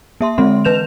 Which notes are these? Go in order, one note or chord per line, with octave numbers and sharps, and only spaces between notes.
A#3 E5 C6
D3 G#3 C4 C6
E3 B4 G6 E7 F7